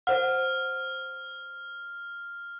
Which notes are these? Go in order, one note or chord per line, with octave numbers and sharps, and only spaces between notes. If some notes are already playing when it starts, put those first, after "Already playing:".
C5 F#5 F6